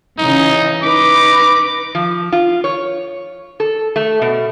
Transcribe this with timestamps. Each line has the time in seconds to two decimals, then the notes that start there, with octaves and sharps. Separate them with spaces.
0.18 C#3 E3 D#4
0.83 D#4 B4 D6
1.95 F3
2.32 F4
2.64 C#5
3.60 A4
3.96 A3
4.22 B2